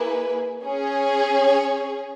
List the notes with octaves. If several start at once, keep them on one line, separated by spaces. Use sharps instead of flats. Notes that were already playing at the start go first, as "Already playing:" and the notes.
Already playing: A#3 E4 G#4 B4
C#4 G#4
C#5